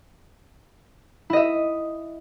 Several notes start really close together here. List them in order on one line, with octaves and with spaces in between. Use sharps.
E4 D#5 E5